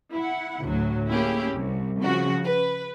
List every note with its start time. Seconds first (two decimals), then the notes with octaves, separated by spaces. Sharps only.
0.14 E4 F#5
0.63 D2 A2 F#3
1.11 A#3 C#4 E4 G4 G#4
1.54 C2
2.00 C#3 F3 F#4
2.43 B4